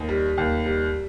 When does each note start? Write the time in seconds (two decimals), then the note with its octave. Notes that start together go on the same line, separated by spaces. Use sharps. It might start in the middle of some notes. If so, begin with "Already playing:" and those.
Already playing: D#2
0.09 G3
0.38 D#2
0.66 G3